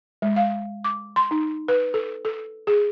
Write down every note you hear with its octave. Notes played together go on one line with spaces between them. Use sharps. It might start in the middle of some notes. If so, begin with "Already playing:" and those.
G#3
F5
D6
C6
D#4
B4
A4
A4
G#4